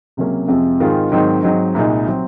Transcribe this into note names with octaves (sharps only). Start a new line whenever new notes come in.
C#2 C3 F#3 A#3 C#4
F2 C3 F3 G#3
G#2 D#3 G#3 C4 F4
G#2 D#3 F#3 C4 D#4
G#2 F#3 C4 D#4
C2 A#2 G#3 D#4
C3 F#3 C4